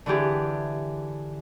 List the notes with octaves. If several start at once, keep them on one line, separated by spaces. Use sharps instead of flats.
D3 E3 E4 G4 G#4